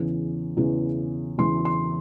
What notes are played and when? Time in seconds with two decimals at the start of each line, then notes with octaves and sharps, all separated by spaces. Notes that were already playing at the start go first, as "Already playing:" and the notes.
Already playing: E2 C#3 E3
0.57 E2 C#3 E3
1.38 E2 C#3 E3 C6
1.65 C6